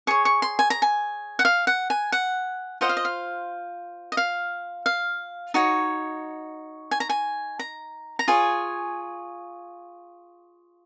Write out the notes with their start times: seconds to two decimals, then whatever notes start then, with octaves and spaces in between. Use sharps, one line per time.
0.07 G#4 C#5 C#6
0.25 C#6
0.42 C6
0.59 G#5
0.70 A#5
0.82 G#5
1.39 F#5
1.45 F5
1.67 F#5
1.90 G#5
2.12 F#5
2.81 F4 C5 D#5 F#5
2.89 F5
2.97 D#5
3.05 F5
4.12 D#5
4.17 F5
4.86 F5
5.54 D#4 F#4 C#5
6.91 G#5
7.00 A#5
7.09 G#5
7.59 A#5
8.19 A#5
8.28 F4 G#4 C#5 G#5